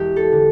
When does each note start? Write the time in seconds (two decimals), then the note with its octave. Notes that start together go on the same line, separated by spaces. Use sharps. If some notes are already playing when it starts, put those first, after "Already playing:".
Already playing: E1 G4
0.16 A4
0.32 D3